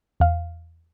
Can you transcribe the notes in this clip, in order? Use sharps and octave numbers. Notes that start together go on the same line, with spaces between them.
E2 F5